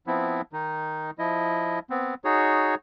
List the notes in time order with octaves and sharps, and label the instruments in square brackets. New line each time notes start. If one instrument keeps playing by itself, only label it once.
[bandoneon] F3 B3 C4 E4
D#3 D#4
F3 E4 D#5
B3 C4
D#4 F#4 G#4 C#5